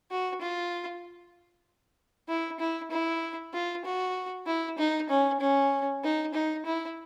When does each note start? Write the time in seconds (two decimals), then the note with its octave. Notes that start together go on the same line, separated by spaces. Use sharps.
0.11 F#4
0.42 F4
2.29 E4
2.60 E4
2.91 E4
3.53 F4
3.85 F#4
4.47 E4
4.78 D#4
5.10 C#4
5.40 C#4
6.03 D#4
6.34 D#4
6.65 E4